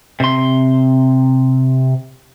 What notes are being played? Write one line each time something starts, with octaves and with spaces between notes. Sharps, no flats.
C3 C6